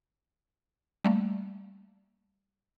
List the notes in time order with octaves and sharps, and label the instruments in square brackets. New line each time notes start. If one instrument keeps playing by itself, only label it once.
[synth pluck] G3 A3 A#3